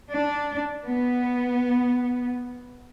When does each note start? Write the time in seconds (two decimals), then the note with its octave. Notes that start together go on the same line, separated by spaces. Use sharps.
0.13 D4
0.85 B3